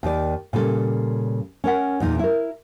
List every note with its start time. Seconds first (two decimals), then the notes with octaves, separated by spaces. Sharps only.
0.03 D#2 D#3 D5
0.53 A#2 C#3 G3 A4
1.64 C#4 A#4 F#5
2.00 E2 A#2 D#4
2.19 E4 A#4